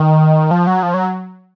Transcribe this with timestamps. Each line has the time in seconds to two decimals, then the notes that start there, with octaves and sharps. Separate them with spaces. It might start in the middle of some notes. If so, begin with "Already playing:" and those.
Already playing: D#3
0.51 F3
0.67 F#3
0.83 F3
0.94 F#3